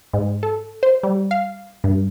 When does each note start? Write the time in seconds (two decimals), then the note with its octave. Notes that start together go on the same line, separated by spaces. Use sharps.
0.13 G#2
0.43 A4
0.83 C5
1.03 G3
1.31 F5
1.84 G2